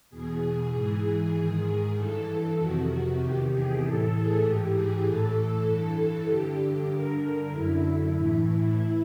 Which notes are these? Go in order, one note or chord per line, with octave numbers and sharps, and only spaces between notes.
E2 B2 G#4
G#2 E3
G#2 D#3
G2 E3 A4
F2 C3 D#3 F#4
E2 C3 D#3 G4
G#4
A2 E3 A4
G#4
G#2 E3 G4
G#4
A2 E3 A4
G2 E3
G2 D3 G4
G2 D3 A#4
F#2 D3 E4
A2 E3
E3